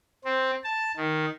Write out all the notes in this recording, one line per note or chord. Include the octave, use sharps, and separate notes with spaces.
C4
A5
D#3